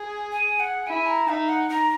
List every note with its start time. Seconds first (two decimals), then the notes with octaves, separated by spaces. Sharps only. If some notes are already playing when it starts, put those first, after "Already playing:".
Already playing: G#4
0.32 G#5
0.60 F#5
0.87 E4 G#5
1.07 A#5
1.28 D#4 E5
1.49 F#5
1.70 A#5